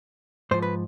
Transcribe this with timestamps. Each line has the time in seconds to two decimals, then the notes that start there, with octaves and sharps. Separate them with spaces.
0.51 G#2 F3 C5
0.62 B4